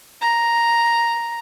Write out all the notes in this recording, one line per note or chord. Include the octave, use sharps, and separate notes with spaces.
A#5